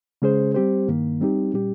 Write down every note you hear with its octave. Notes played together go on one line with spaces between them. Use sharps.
C#3 G#3 C#4 G#4 C5
G3 C4 G4 C5
G2 D#3 A#3
G3 C4 D#4 G4
A#2 G3 C#4 G4